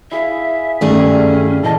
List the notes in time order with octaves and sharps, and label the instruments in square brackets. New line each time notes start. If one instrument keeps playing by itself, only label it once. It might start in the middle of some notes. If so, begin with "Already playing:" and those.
[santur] E4 G#4 F5 [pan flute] E5
[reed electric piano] G2 D#3 [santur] G3 [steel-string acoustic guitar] A3 G#4 [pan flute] C#4
[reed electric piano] A#2 E3 A5 [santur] D4 A4 [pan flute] D#5